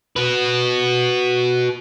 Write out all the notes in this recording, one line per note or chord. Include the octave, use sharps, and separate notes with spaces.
F#4 B4